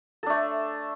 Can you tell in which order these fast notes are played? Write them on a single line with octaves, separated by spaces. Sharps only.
A4 D4 A3